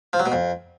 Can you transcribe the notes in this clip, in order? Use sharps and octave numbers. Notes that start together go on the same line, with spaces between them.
F3
F#3
B2
F2